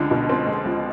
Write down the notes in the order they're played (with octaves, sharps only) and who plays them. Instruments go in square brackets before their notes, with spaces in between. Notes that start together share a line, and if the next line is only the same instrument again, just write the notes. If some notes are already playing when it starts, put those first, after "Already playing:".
Already playing: [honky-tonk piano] C#2 G#3 [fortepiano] D3
[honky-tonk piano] B2
C4
G#3
C#2